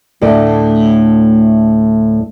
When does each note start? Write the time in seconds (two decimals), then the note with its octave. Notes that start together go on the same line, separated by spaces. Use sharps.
0.21 D2 A2 A3 D5